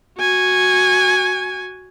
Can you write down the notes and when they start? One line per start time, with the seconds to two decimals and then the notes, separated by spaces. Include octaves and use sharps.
0.18 F#4 G#5